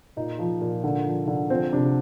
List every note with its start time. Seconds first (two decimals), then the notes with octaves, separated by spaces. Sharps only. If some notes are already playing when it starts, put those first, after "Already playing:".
0.17 A#2 D#4
0.39 F3
0.61 A#2
0.84 D3
1.05 F3
1.28 D3
1.50 F3 C4
1.73 C3 D4